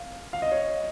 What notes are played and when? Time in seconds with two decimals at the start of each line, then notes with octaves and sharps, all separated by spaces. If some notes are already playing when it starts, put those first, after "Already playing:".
Already playing: F5
0.33 F5
0.42 D#5
0.52 C#5